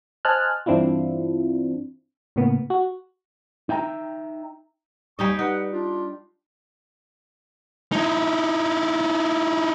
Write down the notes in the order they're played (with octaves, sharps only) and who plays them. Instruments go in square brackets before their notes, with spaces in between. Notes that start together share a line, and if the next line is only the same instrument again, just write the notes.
[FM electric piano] C5 D#5 G#5 A5 F6 F#6
G2 E3 C4 D4 E4 F4
A2 C#3 A#3 B3
F#4
[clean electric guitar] D#4 E5 G5 A#5
[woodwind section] D#2 G#5 C#6 [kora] G3 D#4 D#5
[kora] D#4 [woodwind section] B4 F#5
[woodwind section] D4 F4
[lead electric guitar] D#4 E4